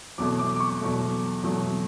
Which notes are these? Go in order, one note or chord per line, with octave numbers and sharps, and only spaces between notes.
E2 B2 F#3 A3 D6
D6
D6
C#6
E2 B2 F#3 A3
E2 B2 F#3 A3